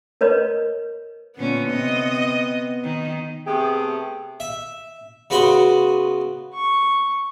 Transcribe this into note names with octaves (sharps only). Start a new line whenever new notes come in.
A#4 B4 C#5 D#5
A#2 D3 B3 C#4
C3 D#5
D#3
C3 A3 B3 G4 G#4
E5
C#3 B3 F#4 F#5 B5 C6
C#6